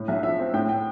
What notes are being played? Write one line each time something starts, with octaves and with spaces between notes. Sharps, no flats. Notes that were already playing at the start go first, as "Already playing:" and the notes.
Already playing: A2
B1 E5
F3 E5
C4
A2 G5
G5